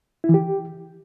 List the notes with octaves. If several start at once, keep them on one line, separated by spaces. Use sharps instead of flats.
E4
E3
G4